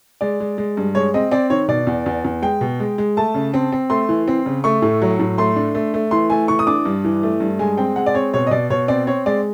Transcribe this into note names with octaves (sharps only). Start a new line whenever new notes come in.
G#3 D5
G#3
G#3
G2
G#3 C#5
C4 D#5
C4 D5
D#3 C#5
B2 D5
E2
E2
E2
G#3 G5
B2
G#3
G#3
A3 A5
C#3
C4
C4
A3 C6
E3
C4
C#3
A3 C#6
A2
F#3
A2
A3 C6
D4
A3
A3
E3 C6
A3 G#5
E3 C#6
D#6
D4 D6
G2
E3
A3
G2
G#3 G#5
C4 G5
G#3 F#5
D5
C4 C#5
B2 C#5
D#5
B2 D5
B2 C#5
C4 D5
C4 C#5
G#3 D5